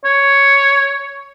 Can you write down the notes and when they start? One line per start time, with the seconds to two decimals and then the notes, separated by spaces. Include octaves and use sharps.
0.05 C#5